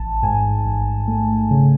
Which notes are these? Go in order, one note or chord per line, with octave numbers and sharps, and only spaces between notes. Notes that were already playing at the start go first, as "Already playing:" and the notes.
Already playing: A1 A5
G#2 G#5
A1
A3
C#3